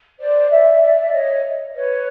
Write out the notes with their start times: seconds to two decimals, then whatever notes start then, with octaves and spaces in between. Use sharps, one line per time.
0.19 C5 D5
0.50 D5 E5
0.81 D5 E5
1.12 C#5 D#5
1.74 B4 C#5